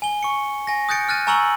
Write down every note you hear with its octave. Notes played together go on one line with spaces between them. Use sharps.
G#5 G7
C#6 C#7
G#5 A#6
D#6 F#6 G6 A6 C#7 D7
F6 F#6 A6 D#7
G#5 A#5 C#6 E6 C#7 F#7